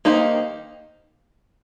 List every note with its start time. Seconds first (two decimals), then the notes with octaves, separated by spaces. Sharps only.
0.05 D#3 A#3 D#4 G4 C5